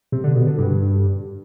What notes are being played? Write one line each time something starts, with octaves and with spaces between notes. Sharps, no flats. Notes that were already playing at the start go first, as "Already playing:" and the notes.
C3
D3
B2
D3
G2